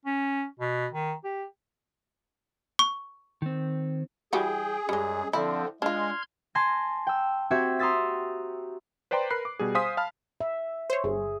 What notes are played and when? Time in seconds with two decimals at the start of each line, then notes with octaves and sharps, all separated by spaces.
0.05 C#4
0.59 B2
0.92 D#3
1.24 G4
2.79 C#6
3.42 D#3 C4
4.33 E3 G3 F#4 G#4 G5
4.89 F#2 G3 G#3
5.33 D3 F3 C4 E4
5.82 G#3 D4 F4 C6 F6 G#6
6.55 G#5 A5 C6 G#6 A#6
7.07 G5 E6
7.50 C4 F#4 G4 E5 G#6
7.79 A#5 C6 D#6 E6 A6 B6
9.11 B4 C5 D5 G5 A#5 C6
9.30 A#4 B4 B5 F#6 C7
9.45 D6
9.59 B2 G3 G#4
9.75 C5 F5 G#5 C6 D#6 B6
9.97 F5 A5 B5 F6
10.41 E5
10.90 C5 C#5
11.04 G1 G#4